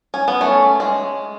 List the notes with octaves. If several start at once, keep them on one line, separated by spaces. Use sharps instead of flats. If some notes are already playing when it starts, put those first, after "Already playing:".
C#4
B3
A3 C#4
G#3